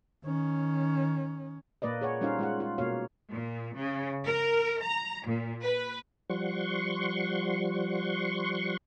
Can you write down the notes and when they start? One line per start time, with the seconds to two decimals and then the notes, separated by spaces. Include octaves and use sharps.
0.25 D#3 C#4
1.82 A#2 A#3 B4 D5 D#5
2.01 G#4 C#5 F#5
2.21 G3 C#4 D#4 F4 C5 F5
2.39 G#3 F4 F#5
2.60 F4
2.78 B2 A#3 B3 F#4 C#5 F5
3.31 A#2
3.76 C#3
4.25 A#4
4.81 A#5
5.25 A#2
5.63 B4
6.30 F3 G3 F#5 C6 C#6